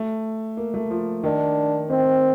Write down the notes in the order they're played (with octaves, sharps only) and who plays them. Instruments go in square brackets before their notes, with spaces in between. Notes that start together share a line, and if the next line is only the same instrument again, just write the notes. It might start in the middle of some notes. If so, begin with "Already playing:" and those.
Already playing: [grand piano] A3
A#3
A3
F3
[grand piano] D#3 [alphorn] D4
[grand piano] D#3 [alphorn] C4